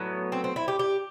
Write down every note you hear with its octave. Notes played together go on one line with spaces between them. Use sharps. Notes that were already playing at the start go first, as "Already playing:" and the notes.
Already playing: A2 F#3 B3
C4
C4
E4
G4
G4